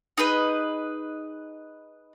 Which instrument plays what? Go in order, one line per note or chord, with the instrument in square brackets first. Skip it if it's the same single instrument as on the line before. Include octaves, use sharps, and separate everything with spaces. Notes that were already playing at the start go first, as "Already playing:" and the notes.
[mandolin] D#4 G#4 B4 D#5